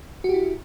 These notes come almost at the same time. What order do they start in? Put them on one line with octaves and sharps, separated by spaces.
F#4 G4 E4